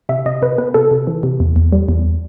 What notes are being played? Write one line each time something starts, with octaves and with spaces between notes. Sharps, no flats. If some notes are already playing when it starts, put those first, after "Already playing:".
C3 E5
C3 D#5
C3 B4
B3 B4
C3 A4
C3
E3
C3
E2
E2
G3
E2